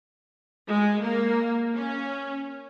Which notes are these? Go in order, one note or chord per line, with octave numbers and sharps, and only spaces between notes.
G#3
A#3
C#4